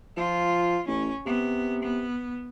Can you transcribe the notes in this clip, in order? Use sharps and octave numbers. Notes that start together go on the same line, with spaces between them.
F3 F4
A1 C#4
C3 B3
B3